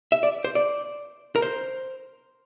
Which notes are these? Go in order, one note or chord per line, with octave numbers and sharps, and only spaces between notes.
E5
D5
C5
D5
A#4
C5